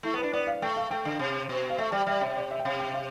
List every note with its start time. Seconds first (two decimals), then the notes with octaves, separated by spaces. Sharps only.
0.03 A3 E4
0.14 B3
0.18 B4
0.23 D4
0.33 B3 D5
0.47 F5
0.62 A3 G5
0.76 F5
0.91 A3 G5
1.05 D3
1.19 C3
1.49 B2
1.70 F5
1.78 A3 E5
1.92 G3 D5
2.06 G3 E5
2.21 C3 E5
2.36 D5
2.51 E5
2.59 G5
2.65 C3 F5
2.79 G5
2.94 F5